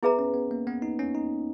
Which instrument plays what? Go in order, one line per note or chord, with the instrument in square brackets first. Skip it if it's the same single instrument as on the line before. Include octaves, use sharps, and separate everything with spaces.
[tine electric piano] B3 [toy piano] E4 G#4 B4 E5 A#5
[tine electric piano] C#4
B3
A#3
B3
D#4
C#4
D#4